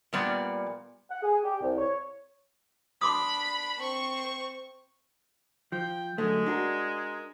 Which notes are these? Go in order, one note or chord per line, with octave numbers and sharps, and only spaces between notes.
A#2 G3 B3 D5
F#5
G#4
G4
C2
C#5
D4 B5 C6 D6 D#6
C4 C#6
F3 G5
F#2 D3 G#3 A3
D4 F#4 A#4